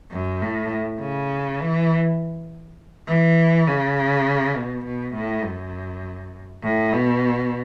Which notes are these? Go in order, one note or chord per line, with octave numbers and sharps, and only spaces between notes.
F#2
A2
C#3
E3
E3
C#3
B2
B2
A2
F#2
A2
B2